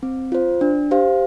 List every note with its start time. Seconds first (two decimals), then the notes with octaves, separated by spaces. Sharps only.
0.03 C4
0.32 F4 C5
0.61 D4
0.91 G4 C5 F5